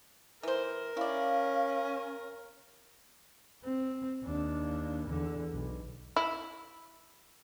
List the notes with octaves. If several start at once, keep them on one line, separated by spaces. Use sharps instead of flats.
E3 A#4 C5
C#4 E4 D5 F5
C4
D#2 D4
E2 D3
B1
E4